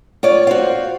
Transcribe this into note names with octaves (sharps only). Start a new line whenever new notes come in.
F4 C#5 D5
F#4 C5 F5